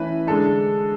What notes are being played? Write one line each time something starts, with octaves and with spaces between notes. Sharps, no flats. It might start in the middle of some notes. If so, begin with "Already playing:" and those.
Already playing: E3 A3 C#4 E4 B4
D3 G#3 D4 A4